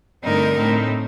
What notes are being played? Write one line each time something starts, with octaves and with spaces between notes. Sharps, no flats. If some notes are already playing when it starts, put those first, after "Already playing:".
G2 D3 A3 C4 D#4 A#4
A2 A3 C4 D#4